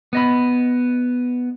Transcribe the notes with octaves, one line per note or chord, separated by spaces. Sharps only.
B3 D#5 B5